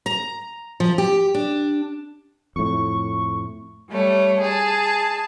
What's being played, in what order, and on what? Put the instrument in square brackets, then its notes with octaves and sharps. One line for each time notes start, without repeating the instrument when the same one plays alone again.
[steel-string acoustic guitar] A#5
F3
G4
D4
[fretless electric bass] F2 A2 [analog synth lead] C#6
[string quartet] G3 A3 C#5
G#4 A5